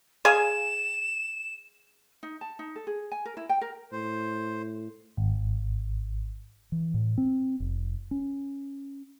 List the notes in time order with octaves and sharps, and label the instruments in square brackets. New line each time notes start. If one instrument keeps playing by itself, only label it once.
[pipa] G#4 F5 G#5 [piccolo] E7
[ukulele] D#4
A5
D#4
A4
G#4
G#5
A#4
E4
G5
A#4
[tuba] A2 [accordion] C5
[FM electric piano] G#1
[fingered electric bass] E3
A2
C4
F1
C#4